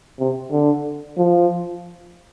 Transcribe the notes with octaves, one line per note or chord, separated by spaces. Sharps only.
C3
D3
F3